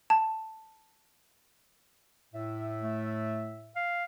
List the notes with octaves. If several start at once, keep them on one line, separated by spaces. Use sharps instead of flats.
A5
A2 E5
A3
F5